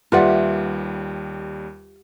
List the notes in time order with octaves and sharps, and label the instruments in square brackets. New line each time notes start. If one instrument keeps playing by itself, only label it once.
[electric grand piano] D#2 G3 [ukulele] F4 B4 D5 [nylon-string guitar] G4 E5 F#5